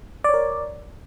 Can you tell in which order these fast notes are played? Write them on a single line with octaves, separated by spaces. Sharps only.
D5 C#5 A#4